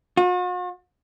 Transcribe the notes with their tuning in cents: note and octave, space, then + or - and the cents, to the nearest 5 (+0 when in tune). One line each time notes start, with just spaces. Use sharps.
F#4 -45